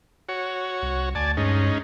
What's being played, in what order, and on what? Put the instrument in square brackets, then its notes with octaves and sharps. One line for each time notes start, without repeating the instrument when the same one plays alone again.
[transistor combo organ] F#4 C#5
[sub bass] C2
[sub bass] D2 [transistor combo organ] D5 G#5 A5
[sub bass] G2 [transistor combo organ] G#3 C#4 D#4